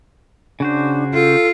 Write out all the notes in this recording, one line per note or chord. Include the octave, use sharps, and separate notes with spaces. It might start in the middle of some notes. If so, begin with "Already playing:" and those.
C#3 D4 F#4 C5
F4 A4